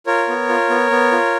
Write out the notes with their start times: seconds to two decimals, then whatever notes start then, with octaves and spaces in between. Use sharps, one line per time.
0.07 F4 A#4 C#5
0.29 B3
0.49 F4
0.70 B3
0.91 B3
1.12 F4